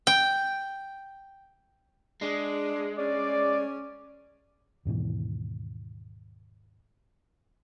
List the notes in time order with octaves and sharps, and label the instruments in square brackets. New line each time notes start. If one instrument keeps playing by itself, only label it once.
[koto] G5
[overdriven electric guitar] G#3 [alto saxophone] D4
[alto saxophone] C#4 [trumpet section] D5
[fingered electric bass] D#2 G#2 B2 E3